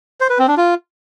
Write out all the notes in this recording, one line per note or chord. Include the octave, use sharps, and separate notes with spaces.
C5
B4
C4
D4
F4